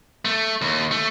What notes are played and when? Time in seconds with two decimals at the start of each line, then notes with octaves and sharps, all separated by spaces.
0.25 A3
0.62 D#2
0.91 A3